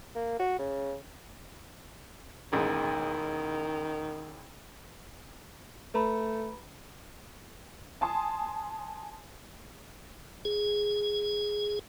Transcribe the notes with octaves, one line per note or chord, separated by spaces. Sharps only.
A#3
F#4
C#3
E1 A1 D#3 G#4
A3 B4 A#5 B5
G#5 A5 C6 D#6
G#4